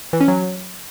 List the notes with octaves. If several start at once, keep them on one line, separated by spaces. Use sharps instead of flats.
E3
C#4
F#3